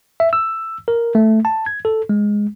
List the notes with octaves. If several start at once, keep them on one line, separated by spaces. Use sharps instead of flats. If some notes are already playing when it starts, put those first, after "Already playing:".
E5
E6
A#4
A3
A5
G#6
A4
G#3